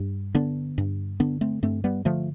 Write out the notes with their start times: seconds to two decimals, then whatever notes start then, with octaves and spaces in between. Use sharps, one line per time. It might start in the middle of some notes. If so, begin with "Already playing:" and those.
Already playing: G2
0.34 D3 B3 D4
0.78 G2
1.20 D3 B3 D4
1.41 A3 C4
1.63 G2 A3 C4
1.84 G3 B3
2.05 D3 F3 A3